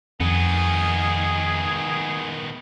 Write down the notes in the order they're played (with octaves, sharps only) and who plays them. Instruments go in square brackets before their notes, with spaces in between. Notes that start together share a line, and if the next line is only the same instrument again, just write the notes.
[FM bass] F2 [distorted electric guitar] D#3 B3 [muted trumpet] G#4